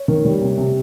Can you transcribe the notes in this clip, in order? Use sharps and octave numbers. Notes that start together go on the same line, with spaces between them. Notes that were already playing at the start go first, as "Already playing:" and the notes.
Already playing: C#5
D#3
G3
C3
C3